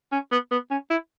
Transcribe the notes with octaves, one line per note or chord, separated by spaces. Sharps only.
C#4
B3
B3
C#4
E4